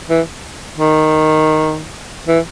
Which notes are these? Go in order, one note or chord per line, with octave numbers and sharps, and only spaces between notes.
E3
D#3
E3